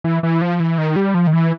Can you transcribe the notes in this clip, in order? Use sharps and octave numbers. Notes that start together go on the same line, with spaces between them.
E3
E3
F3
E3
D#3
G3
F3
D#3
E3